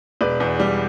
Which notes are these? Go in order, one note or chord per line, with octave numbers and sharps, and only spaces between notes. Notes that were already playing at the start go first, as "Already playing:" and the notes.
E1 B4 D5
E2
G3